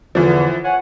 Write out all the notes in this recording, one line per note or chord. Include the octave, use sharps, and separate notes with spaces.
E2 D3 E3 F3
C#5 F#5 G#5